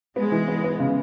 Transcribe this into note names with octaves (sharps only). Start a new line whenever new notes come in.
G#3 B3
E3
B3
B3
C#3